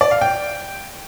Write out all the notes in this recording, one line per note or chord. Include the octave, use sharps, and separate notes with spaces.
D5
F5
G5